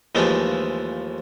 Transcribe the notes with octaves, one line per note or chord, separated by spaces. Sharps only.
D#2 E3 F3 G#3 A3